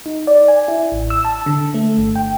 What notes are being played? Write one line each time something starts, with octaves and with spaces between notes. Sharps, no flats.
D#4
D5
G#5
E4
A1
E6
A5
D3
A3
G1
G5